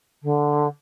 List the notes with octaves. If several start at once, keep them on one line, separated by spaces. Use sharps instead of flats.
D3